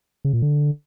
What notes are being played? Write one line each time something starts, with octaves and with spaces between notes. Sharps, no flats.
C#3
A#2
D3